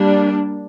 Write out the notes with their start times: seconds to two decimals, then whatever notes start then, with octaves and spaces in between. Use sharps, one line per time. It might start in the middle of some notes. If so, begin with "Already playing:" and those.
Already playing: G3 A#3 D4